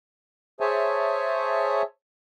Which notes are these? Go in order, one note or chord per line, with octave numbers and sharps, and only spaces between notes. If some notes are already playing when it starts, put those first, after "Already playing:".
G#4 C5 C#5 E5 G#5 A5